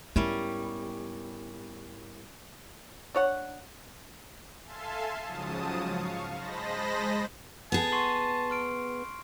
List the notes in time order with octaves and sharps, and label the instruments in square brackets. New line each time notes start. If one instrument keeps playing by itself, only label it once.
[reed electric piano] G#2 E4 A#4 [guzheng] G3 C#4 [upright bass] B3
[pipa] D4 C#5 F#5
[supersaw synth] A4 E5 F5 G#5 A5 C6
G#2 C#3 F3 F#3 A5 D#6
F5 C#6
G#3 C5 D#5 A5 B5 A#6
[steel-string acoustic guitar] B3 G#4 [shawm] A5
[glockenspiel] C6 C#6 C7
C6 F6 D7